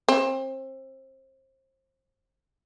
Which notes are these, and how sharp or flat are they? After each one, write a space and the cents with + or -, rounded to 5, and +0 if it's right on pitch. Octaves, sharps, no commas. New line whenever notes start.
C4 +30